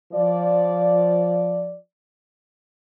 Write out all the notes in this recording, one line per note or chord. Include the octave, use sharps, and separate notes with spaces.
F3 D5